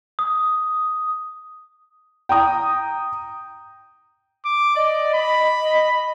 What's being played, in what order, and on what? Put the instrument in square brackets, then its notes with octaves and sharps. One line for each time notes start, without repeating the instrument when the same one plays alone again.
[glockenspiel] D#6
[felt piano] G5 A#5 D#6
[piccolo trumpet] D6
[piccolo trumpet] D5 [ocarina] D#5
[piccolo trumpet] B5
[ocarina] D#5